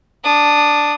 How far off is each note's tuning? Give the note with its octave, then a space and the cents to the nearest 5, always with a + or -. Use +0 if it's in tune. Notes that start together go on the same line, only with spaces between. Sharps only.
D4 +0 D#6 -15